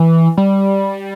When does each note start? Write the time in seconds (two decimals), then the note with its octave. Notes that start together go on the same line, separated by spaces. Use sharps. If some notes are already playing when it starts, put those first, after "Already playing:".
Already playing: E3
0.37 G3